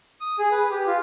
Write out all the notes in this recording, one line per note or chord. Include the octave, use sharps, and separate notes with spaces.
D#6
G#4
B4
G4
F4